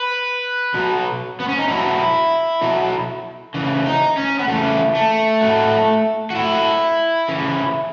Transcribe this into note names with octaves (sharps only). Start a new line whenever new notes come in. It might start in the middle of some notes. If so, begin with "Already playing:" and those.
Already playing: B4
B2 F#3
B3
C#4
D#4
B2 F#3 E4
B2 F#3
C#3 E3
D#4
C#4
B3
C#3 E3 A3
A3
A2 F#3
F#4
A2 F#3 E4
C#3 E3